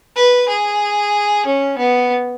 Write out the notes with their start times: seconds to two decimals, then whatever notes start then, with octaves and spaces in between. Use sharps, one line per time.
0.16 B4
0.48 G#4
1.46 C#4
1.78 B3